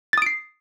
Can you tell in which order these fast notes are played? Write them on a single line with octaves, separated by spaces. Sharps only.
A6 D#6 D7 C7